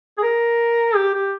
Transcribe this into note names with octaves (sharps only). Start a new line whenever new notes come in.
G#4
A#4
G4
G4